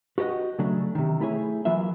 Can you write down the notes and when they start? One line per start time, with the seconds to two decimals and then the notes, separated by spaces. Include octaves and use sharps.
0.18 F#4 G4 A#4 D#5 F#5
0.59 C#3 F#3 A3 D4
0.95 C3 D#3
1.20 A3 E4 G4 G#4 C#5
1.65 E3 F#3 A#3 F4 E5